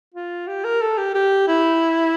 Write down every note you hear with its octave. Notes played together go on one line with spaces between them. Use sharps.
F4
G4
A#4
A4
G4
G4
E4